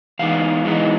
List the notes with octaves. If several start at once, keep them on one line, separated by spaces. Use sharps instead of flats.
E3 G#3 B3 D#4 F5
E3 G#3 B3 D#4